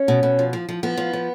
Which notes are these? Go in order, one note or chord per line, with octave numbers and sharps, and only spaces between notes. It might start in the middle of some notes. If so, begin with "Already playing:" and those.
Already playing: C#4
B2
B2
F3
F3
F3
F3 B3
F3
F3